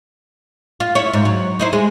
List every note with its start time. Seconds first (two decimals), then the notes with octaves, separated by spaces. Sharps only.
0.80 F4
0.95 E4 C#5
1.13 G#2
1.25 F#3
1.59 D#4 E4 C5
1.73 G#3